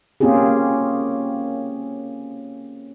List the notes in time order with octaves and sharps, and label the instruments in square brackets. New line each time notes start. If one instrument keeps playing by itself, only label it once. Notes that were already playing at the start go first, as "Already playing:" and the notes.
[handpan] A#3 C4 C#4 F4 G4 G#4